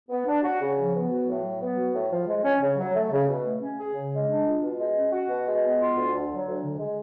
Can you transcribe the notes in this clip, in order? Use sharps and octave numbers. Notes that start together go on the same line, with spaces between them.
B3
D4
F#4
C#3
F3
B3
F#4
A2
F#3
B3
F#4
A2
F3
G#3
C#4
C#3
F#3
A3
C#3
B2
A3
C#4
G#4
C#3
G#3
D4
F4
B2
G#3
C#4
F#4
B2
G#3
B3
F4
D2
D3
F#3
D2
D3
G#3